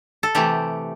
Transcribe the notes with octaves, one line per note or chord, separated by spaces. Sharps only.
A4
C3 E3 A3 G4